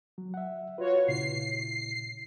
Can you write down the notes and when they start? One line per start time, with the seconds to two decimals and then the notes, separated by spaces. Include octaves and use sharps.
0.18 F#3
0.34 E5 F#5
0.78 F4 F#4 B4 C#5
1.08 A#2 C#3 E4 C7